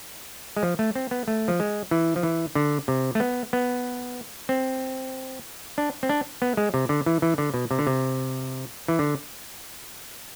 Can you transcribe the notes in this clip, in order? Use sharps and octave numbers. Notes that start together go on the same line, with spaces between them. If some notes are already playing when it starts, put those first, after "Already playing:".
G#3
F3
A3
C4
B3
A3
F3
G#3
E3
F3
E3
D3
C3
A3
B3
B3
C4
D4
C4
D4
B3
G#3
C3
D3
E3
E3
D3
B2
C3
D3
C3
E3
D3